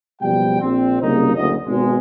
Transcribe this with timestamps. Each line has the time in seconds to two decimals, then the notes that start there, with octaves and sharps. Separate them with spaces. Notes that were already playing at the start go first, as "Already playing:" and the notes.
0.22 F#1 B2 F3 G3 G5
0.61 A#1 C4
1.02 F#1 C2 C#3 A#3 D#4
1.36 F#1 D2 D#5
1.66 G#1 B2 G#3